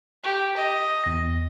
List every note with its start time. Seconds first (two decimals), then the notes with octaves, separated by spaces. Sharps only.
0.24 G4
0.57 D#5
1.04 E2 A#6